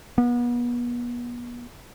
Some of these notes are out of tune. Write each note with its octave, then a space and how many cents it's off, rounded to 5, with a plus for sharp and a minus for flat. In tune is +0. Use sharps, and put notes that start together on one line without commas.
B3 -35